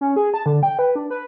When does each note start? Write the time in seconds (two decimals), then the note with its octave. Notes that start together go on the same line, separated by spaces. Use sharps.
0.01 C#4
0.16 G#4
0.34 A5
0.46 D3
0.63 G5
0.79 B4
0.96 D4
1.10 B4